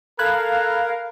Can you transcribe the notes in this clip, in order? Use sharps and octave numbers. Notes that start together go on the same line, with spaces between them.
A4 A#4 F5 B5 F#6 G#6